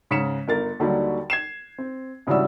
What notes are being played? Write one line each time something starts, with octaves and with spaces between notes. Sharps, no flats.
G#2 C#3 B6 C#7 E7
G1 A#4 A6
D#2 D3 F#3 G3 D#4
G#6 C7 E7
C4
G#1 C#3 E3 G3 F#4 E6